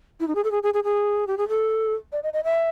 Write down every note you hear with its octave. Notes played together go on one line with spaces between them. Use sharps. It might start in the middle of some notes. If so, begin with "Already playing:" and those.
E4
D#4
G#4
A4
G#4
G#4
G#4
G#4
G4
G#4
A4
D5
D#5
D#5
E5